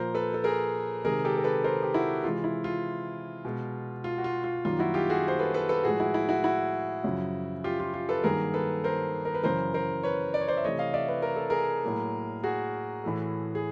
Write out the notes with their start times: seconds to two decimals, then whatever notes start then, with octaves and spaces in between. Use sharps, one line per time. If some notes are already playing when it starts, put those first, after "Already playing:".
Already playing: A#2 F3 A#3 A#4 C5
0.15 A4 B4
0.34 A4
0.44 G#4 A#4
1.05 C3 D#3 G#3 G#4 A#4
1.25 G4 A4
1.37 A#4
1.44 A4 B4
1.64 A#4 C5
1.83 G4
1.94 E4 F#4
2.24 C3 E3 G#3 F4
2.44 E4
2.64 F4
3.45 B2 G#3
4.04 F4
4.18 F#4
4.24 F4
4.44 F4
4.65 F#2 D#3 G3 A#3 F4
4.79 E4 F#4
4.94 F4 G4
5.09 F#4 G#4
5.28 C5
5.39 A4 B4
5.54 A4 B4
5.69 A4 B4
5.84 A2 F3 G#3 F#4 G#4
6.00 E4 F#4
6.14 E4
6.29 E4 F#4
6.44 E4 F#4
7.04 F#2 C#3 F3
7.64 F4 G4
7.80 F4
7.94 F4
8.09 A4 B4
8.24 G2 D#3 F#3 A#3 G#4 A#4
8.54 A4 B4
8.84 A#4 C5
9.25 A#4
9.35 B4
9.43 F#2 C#3 E3 A#4 C5
9.74 A#4 C5
10.03 B4 C#5
10.34 D5
10.41 C#5
10.48 C5 D5
10.57 E5
10.64 C3 E3 A3 C#5 D#5
10.79 D#5 F5
10.94 D5 E5
11.08 B4
11.22 A#4
11.36 A4
11.50 G#4 A#4
11.84 A2 F#3 A#3
12.44 F#4 G#4
13.04 A2 E3 A3
13.55 G#4